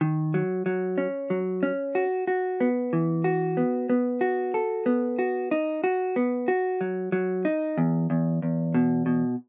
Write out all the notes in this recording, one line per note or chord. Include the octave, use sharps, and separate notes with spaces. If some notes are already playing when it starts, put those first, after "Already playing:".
D#3
F#3
F#3
C#4
F#3
C#4
F#4
F#4
B3
E3
F#4
B3
B3
F#4
A4
B3
F#4
D#4
F#4
B3
F#4
F#3
F#3
D#4
E2
E2
E2
B2
B2